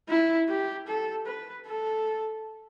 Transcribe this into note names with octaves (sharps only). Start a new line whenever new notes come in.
E4
G4
A4
B4
A4